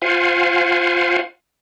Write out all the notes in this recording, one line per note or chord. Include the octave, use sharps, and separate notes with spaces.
F4 C5 F5 F#5 G#5